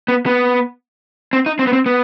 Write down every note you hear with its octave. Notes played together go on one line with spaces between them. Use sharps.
B3
B3
C4
D#4
C4
B3
C4
B3